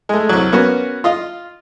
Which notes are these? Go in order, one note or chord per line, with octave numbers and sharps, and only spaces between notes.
G#3 A3
C2 F#3
A#3 B3 C#4 F#4
F4 D#5 F5